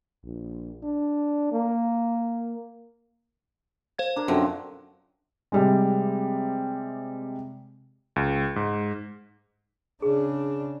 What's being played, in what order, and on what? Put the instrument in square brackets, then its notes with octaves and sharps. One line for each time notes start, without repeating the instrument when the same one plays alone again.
[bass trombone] A#1
D4
A#3
[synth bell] C5 F5 G#6
[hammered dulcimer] D4 A#4
[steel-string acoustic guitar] F#2 [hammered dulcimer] D3 F3 C4
[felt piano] C3 G3 G#3
[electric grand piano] C#2
G#2
[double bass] C#3 D4 [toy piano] G#4